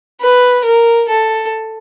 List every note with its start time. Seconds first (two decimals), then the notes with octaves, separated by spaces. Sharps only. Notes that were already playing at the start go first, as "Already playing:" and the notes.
0.22 B4
0.65 A#4
1.09 A4